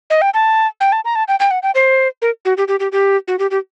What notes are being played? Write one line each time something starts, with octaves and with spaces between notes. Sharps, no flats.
D#5
G5
A5
G5
A5
A#5
A5
G5
G5
F#5
G5
C5
A#4
F#4
G4
G4
G4
G4
F#4
G4
G4